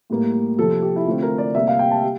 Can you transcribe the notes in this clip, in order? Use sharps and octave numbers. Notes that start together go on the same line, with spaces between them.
A2 G3 A#3
C3 F3 C4 A4
G4
E4
D3 A3 C4 F4
A#4
D5
C3 G3 A#3 E5
F5
G5
A5
G3